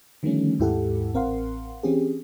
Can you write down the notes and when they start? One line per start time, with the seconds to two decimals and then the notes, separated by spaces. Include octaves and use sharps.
0.23 D3 D#3 F3 G3 A3 C#4
0.59 D#2 G#2 E4 G4 A4 F#5
1.14 A1 C4 A#4 F5 F#5 C6
1.83 E3 C4 C#4 G4 G#4